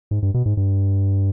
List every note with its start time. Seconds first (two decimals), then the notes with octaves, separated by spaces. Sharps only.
0.11 G#2
0.22 G2
0.34 B2
0.46 G#2
0.57 G2